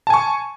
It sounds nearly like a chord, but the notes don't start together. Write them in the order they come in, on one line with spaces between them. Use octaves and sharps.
A5 G#5 C#6